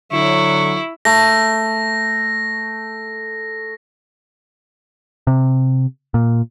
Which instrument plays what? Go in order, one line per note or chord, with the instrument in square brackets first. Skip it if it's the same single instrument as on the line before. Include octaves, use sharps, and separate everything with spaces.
[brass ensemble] D3 F#3 [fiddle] E4 [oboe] C#6
[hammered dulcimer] A3 [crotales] A#6
[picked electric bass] C3
A#2